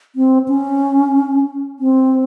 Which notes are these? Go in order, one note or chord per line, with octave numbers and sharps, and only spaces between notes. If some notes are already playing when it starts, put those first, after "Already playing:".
C4
C#4
C4